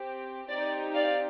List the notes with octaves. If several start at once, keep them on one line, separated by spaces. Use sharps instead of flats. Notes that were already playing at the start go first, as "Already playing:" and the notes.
Already playing: C4 G4
C4 D#4 G4 D5
D5 F5